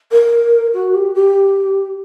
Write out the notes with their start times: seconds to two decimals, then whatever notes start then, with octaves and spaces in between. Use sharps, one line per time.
0.12 A#4
0.74 F#4
0.94 G4
1.15 G4